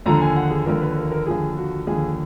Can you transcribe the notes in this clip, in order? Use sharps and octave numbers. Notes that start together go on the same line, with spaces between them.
D#2 D3 F3 A#5
G#5
F#5
G#4
D#2 D3 F3 A#4
B4
A#4
A#4
D#2 D3 F3 G#4
F#4
D#2 D3 F3 G#4